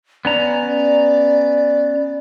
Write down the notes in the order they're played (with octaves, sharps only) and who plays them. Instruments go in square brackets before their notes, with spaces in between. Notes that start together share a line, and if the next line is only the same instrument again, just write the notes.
[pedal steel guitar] B3 C#4 A#5 [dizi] D5